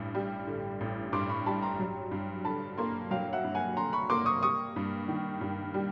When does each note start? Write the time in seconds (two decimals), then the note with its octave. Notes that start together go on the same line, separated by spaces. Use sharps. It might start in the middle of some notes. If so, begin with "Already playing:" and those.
Already playing: A1 G2
0.15 G3
0.47 D3
0.81 A1
1.13 G2 C6 D6
1.30 B5 C#6
1.46 G3 A5 B5
1.62 A#5 C6
1.79 F#3
2.11 G2
2.45 D3 A5 B5
2.78 A#3 A#5 C6
3.11 F#3 F5 G5
3.33 E5 F#5
3.44 G2
3.55 F#5 G#5
3.77 D3 A#5 C6
3.93 B5 C#6
4.10 A#3 C6 D6
4.26 C#6 D#6
4.42 G3 C#6 D#6
4.76 G2
5.08 D#3
5.41 G2
5.74 G3